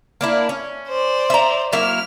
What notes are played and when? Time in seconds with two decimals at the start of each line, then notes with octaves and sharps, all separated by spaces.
0.21 A#3 D4 E4
0.49 C#4
0.89 C5 D5
1.30 E5 A#5
1.72 F#3 A#3 E4 F6